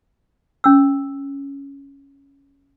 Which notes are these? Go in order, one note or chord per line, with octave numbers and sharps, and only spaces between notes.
C#4 E6